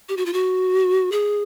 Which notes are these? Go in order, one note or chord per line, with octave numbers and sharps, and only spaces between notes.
G4
F#4
F4
F#4
G#4